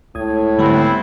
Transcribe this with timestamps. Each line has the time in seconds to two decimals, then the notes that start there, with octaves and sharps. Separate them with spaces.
0.15 C#2 A2 D#6 G#6
0.58 G#2 D3 G3 A3 B3 C4 E4